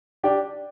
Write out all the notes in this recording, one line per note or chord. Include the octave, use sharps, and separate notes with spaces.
D4 G4 D5